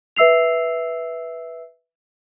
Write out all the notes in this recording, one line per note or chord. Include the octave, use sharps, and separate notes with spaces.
B4 E5 E6 C7 F7